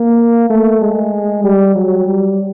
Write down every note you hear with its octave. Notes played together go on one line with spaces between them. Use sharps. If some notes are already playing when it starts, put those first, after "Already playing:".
Already playing: A#3
A3
G#3
G3
F#3
G3